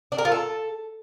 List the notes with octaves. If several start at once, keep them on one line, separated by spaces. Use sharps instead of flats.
D4
A#4
F4
A4